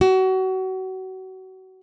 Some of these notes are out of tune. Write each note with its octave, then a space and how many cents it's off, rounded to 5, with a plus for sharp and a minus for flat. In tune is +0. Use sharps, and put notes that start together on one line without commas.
F#4 +30